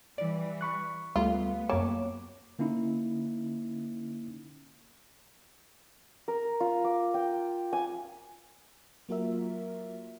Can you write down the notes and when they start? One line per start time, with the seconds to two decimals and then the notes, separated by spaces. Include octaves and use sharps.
0.18 E3 G3 D5
0.61 B5 C#6 F#6
1.16 D2 G3 A3 B3 F4
1.69 F#2 A#3 C#5 A5 D6
2.59 D3 A#3 C#4 D#4 E4
6.28 A#4
6.60 F4
6.84 D6
7.14 G5
7.73 G#5
9.09 F#3 A#3 F4 F#4 A#4 E5